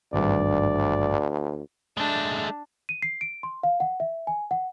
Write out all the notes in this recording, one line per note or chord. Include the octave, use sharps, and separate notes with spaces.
G#1 D2 G2 D5
G#3 A3 D4
D#7
C7
D7
C6
F5
F#5
E5
G#5
F#5